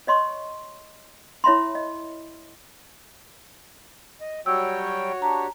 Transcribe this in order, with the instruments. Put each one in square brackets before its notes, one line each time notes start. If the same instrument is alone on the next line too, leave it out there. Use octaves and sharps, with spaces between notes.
[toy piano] C#5 D#5 C6 C#6
E4 C#5 E5 B5 C6
D#5
[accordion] D#5
[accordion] F#3 G3 G5 [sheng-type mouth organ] F#4 C#5 [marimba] E6
[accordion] D4 G4 [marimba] A5 A#5